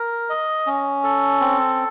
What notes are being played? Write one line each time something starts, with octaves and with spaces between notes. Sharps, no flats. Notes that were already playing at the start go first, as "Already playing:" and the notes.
Already playing: A#4
D#5
C#4
A4
C4